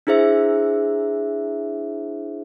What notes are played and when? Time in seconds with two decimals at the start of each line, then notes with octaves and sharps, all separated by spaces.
0.07 D4 E4 G#4 C5 E5